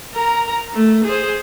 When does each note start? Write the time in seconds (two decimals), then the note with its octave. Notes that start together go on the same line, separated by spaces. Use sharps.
0.14 A#4 A#5
0.74 A3
1.05 G#4 C5